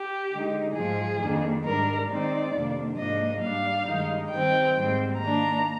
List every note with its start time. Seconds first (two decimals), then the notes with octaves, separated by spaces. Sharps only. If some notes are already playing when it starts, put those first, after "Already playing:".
Already playing: G4
0.31 D3 G#3 D#4
0.75 G#2 F3 G#3 G#4
1.20 F2 D#3 A#3 D4
1.65 G#2 G3 D4 A#4
2.09 D#3 G#3 C4 D#4 D5
2.53 F2 C3 D#3 A#3 D4
2.97 G#2 F3 A#3 D4 D#5
3.42 G#2 G3 D4 F5
3.87 G2 D#3 G#3 D#4
4.31 D#3 G3 C4 G5
4.75 G#2 G3 C4
5.20 D#3 A#3 D4 A#5